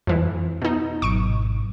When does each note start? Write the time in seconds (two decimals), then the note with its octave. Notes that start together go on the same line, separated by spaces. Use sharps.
0.07 F2 E3
0.61 B2 D#4
1.02 G#1 B2 F#3 C#6 D7